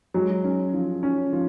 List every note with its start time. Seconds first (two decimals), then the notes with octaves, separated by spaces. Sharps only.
0.14 F#3 G#3
0.44 C#4
0.73 F3
1.03 C#4
1.33 F3